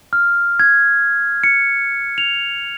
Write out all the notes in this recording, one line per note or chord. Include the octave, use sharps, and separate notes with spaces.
F6
G#6
C#7
F7